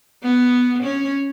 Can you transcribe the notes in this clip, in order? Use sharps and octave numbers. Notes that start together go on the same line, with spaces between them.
B3
C#4